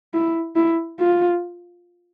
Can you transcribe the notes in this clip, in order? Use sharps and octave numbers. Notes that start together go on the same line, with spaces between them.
E4
E4
F4